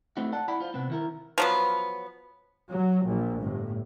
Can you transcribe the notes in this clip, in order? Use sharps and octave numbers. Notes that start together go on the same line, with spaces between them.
A3 C4 D#4 E4 F#4
D5 F#5 A5
E4 D5 F#5 B5
F4 C5
C3 B3 C4
D#3 E4 A#4
F3 F#3 B3
F#3
A#1
G1 A2